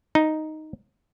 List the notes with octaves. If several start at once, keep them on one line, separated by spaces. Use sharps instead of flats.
D#4